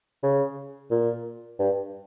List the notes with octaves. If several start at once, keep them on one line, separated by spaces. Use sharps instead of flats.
C#3
A#2
G2